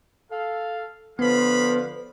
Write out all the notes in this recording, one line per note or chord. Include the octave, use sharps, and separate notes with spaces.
A4 F5
D3 F3 B3 B4 F5 B5